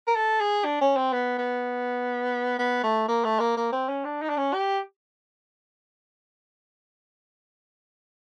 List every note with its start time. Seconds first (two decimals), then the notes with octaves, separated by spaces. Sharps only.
0.07 A#4
0.16 A4
0.41 G#4
0.64 D4
0.81 C#4
0.96 C4
1.13 B3
1.38 B3
2.59 B3
2.83 A3
3.08 A#3
3.24 A3
3.40 A#3
3.57 A#3
3.72 C4
3.88 C#4
4.05 D4
4.22 D#4
4.29 D4
4.37 C#4
4.53 G4